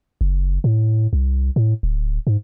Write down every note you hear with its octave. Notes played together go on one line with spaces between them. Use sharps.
F#1
A2
C2
A2
D1
G#2